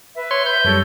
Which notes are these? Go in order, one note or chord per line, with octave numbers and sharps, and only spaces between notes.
B4 E5
C#5 C6
G6
F#2 G3 A4 A#4 C#5